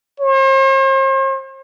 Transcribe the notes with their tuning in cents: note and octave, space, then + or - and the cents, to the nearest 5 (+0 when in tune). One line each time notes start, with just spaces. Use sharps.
C5 +45